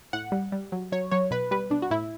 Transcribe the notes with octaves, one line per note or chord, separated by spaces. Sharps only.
A2 F#5
G3
G3
F#3
F#3 C#5
F#3 C#5
B2 B4
G3 B4
B2 D4
F#4
A2 E4